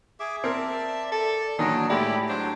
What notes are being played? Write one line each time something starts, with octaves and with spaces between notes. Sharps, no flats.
G#4 E5 D6
C4 A#4 D5 A5
A4 D5
A#2 D#3 E3 F#3 D4 D#4 D#5
A2 G#3 E4 G4 D5
F#3 D4 C5